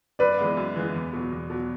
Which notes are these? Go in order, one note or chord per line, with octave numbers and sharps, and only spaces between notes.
F#2 B4 D5
E3 G#3 B3
F#2
E3 G#3 B3
E2
B2 F#3
E2
B2 F#3